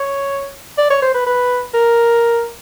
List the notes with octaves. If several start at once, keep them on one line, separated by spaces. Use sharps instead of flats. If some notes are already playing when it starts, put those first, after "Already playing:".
Already playing: C#5
D5
C#5
C5
B4
B4
A#4